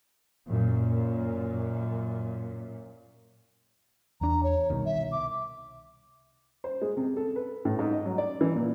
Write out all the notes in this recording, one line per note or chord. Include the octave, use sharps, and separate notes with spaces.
F#2 A#2
E2 D4 A#5
C#5
C2 B2 D#3
E5
D6
C5
G#3
C3
A4
B4
A2
G#2
D#5
F#3
D5
E3
A#2